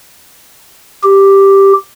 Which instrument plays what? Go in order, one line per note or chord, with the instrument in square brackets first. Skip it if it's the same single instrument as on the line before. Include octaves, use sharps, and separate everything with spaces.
[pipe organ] G4